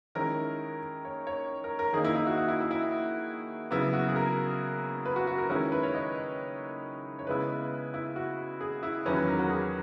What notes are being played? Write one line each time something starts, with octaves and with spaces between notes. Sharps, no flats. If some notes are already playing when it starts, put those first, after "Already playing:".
D#3 G#3 C#4 E4 A#4
C#5
C#5
A#4
A#4
D#3 A#3 D#4 G#4
E4
E4
F#4
F#4
E4
E4
E4
C#3 F#3 B3 E4
F#4
G#4
A#4
B4
F#4
F#4
A#4
D#3 G#3 C#4 E4 A#4
B4
C#5
D#5
C#5
C#3 G#3 B3 E4 B4
E4
F#4
G#4
E4
E2 D#3 F#3 C#4 B4
B4
A#4
F#4
G#4